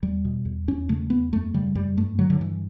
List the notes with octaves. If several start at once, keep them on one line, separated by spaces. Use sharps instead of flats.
E2 G3
B2
E2
E2 C#4
C#3 A3
E2 B3
F#2 A3
C#3 G3
F#2 G3
G2 A3
D3 F#3
D3
G2 E3